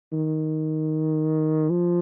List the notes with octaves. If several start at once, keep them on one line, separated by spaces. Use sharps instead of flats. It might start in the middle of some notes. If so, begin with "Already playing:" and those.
D#3
F3